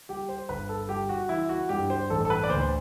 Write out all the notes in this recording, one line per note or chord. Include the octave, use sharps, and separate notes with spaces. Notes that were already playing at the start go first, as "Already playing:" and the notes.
G3 G4
C5
G1 B4
A4
G3 G4
F#4
E3 E4
F#4
G2 G4
C5
A1 A4
A4
B4
D5
D2 C5